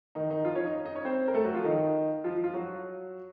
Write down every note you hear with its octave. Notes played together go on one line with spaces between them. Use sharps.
D#3 D#4
D#3 D#4
F3 F4
C#4 C#5
D#4 D#5
D#4 D#5
C#4 C#5
C4 C5
A#4
A3 A4
F#3 F#4
F3 F4
D#3 D#4
F3 F4
F3 F4
F#3 F#4